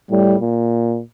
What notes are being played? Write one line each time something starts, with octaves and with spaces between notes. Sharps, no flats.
A2 G3
A#2